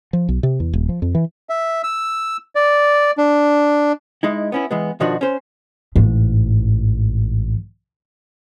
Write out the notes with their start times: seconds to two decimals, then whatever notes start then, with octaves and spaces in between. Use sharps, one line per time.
0.13 F3
0.29 B1
0.43 C3
0.60 E2
0.73 D#1
0.89 F3
1.02 F2
1.15 E3
1.49 E5
1.84 E6
2.55 D5
3.18 D4
4.23 G#3 D#4 E4
4.52 B3 C#4 E4
4.71 E3 G#3 B3
5.00 B2 D#3 F3 D4 D#4 F#4
5.21 C#4 C5
5.96 A1 G#2